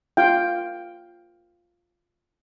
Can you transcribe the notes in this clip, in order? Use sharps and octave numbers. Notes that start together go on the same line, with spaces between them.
F4 F5 G5